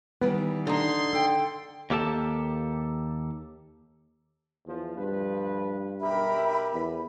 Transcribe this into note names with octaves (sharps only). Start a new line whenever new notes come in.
D#3 E3 G3 B3
D3 D#4 C6
A4 G5
D#2 A#3 G4 A4 A5
E2 F3
D2 G2 F3 B4
B1 G4 A#4 E5 B5
E2 B5